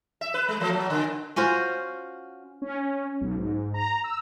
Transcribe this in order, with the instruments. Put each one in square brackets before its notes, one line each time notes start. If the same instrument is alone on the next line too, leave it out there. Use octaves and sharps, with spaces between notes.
[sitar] E5
B4
G#3
F3 A3 A#3
F#3
B2 D3
[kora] C#4 F4 F#4 C5
[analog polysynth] C#4
B1
G#2
A#5
E6